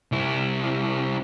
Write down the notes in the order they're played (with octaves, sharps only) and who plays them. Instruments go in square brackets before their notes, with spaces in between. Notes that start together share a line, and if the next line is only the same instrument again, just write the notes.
[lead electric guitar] C2 E4